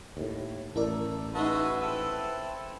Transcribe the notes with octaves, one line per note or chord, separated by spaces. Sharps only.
D#2 A2
A1 A3 E4 A#4 D5
G#3 D#4 F#4 B4 E5 A5
C4 E4 A4 E6